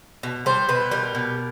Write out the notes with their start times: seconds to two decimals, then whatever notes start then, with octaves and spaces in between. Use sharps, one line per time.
0.23 B2
0.46 G3 C5
0.69 B2 B4
0.91 G3 A#4
1.15 B2